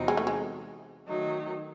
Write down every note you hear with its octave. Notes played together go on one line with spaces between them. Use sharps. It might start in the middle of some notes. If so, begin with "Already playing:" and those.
Already playing: E2 C3 F#3 C4 D#4
G#3
A3
G#3
D#3 F#3 A3 D#4